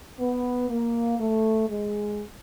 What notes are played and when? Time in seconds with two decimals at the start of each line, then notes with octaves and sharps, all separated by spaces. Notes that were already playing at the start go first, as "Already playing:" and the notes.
0.19 B3
0.70 A#3
1.19 A3
1.69 G#3